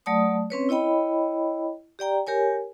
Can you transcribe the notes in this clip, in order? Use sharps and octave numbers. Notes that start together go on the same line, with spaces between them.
F#3 A3 D5 A5 D#6
C4 C#4 B4 C#5
E4 C#5 D#5 G5 B5
G4 D5 G5 A#5
G4 A#4 C#5 G#5